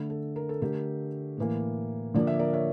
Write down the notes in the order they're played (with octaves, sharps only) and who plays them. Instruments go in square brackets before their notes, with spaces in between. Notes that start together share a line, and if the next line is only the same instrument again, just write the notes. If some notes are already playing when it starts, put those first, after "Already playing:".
Already playing: [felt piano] D3 A3
A4
A#4
A4
D3 A3 G4 A#4
A2 E3 A#3
D3 F3 A#3 D5
E5
A#4 D5
C#5 E5